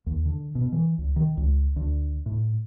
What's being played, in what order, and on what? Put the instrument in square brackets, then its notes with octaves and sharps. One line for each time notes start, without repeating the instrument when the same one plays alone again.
[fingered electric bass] D#2
D3
B2
E3
C#2
D#3
C#2
D2
A2